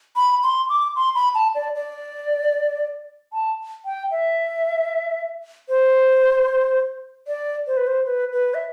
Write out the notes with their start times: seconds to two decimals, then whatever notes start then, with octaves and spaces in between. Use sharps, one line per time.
0.16 B5
0.43 C6
0.69 D6
0.96 C6
1.15 B5
1.35 A5
1.55 D5
1.75 D5
3.32 A5
3.85 G5
4.11 E5
5.69 C5
7.27 D5
7.67 C5
7.77 B4
7.87 C5
8.06 B4
8.33 B4
8.54 E5